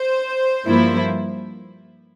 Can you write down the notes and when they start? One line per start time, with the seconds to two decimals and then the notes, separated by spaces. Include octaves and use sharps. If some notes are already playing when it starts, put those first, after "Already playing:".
Already playing: C5
0.65 G2 F3 A#3 E4